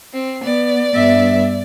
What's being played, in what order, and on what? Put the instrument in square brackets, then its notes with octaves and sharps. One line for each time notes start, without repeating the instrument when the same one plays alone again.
[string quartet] C4
[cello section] B3 [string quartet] D5
[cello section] G2 B3 E5